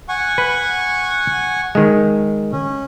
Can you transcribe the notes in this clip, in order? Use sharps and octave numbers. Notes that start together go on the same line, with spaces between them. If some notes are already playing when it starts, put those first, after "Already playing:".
F#5 G#5 C#6
B4
D#3 G#3
C#4